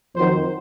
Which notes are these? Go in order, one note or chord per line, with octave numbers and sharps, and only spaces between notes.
F2 D#3 F#3 C5